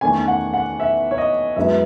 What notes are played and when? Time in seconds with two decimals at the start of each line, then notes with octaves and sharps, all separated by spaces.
0.01 E2 D#3 A3 C#4 G#5
0.28 F#5
0.53 F#5
0.80 E5
1.11 C#5
1.18 D#5
1.56 F#2 E3 G#3 B3 E5